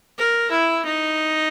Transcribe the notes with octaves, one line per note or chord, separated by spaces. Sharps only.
A#4
E4
D#4